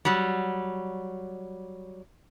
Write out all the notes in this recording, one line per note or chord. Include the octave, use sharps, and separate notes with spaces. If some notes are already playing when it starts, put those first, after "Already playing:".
F#3 G3